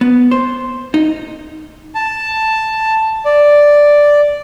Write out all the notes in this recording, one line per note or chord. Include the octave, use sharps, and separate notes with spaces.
B3
C5
D#4
A5
D5